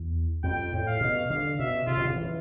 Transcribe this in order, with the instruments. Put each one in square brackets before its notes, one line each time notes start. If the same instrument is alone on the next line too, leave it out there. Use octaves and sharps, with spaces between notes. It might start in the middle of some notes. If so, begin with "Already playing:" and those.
Already playing: [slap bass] E2
[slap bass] F2 [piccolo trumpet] G5
[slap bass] A2
[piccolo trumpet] F5
[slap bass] B2
[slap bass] D3 [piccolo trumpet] F5
[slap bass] B2 [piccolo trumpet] E5
[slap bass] C3 [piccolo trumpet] F4
[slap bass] B2
C3
E3